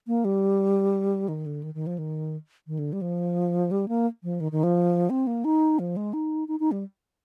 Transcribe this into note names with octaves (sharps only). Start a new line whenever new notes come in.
A#3
G3
D#3
D3
D#3
D#3
F3
D#3
D#3
D3
G3
F3
G3
A#3
F3
D#3
D#3
F3
C4
A#3
D#4
F3
G#3
D#4
D#4
D#4
G3